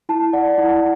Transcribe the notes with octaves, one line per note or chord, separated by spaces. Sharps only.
E4 A5
D5 F#5
E4 F#5